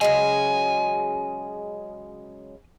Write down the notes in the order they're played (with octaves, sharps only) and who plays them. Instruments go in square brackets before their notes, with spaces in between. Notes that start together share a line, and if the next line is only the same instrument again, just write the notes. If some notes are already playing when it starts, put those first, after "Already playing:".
[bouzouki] C#3 F#3 G#3 [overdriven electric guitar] G#5